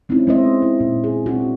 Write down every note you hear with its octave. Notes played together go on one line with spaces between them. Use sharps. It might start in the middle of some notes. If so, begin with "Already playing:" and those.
G#3 C4 C#4 D#4 E4
G#3 B3 C4 C5 D#5 E5
E4
A#2
G#4
C4 D4 F#4